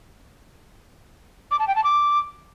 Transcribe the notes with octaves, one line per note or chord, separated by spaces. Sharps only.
D6
A5
G5
A5
D6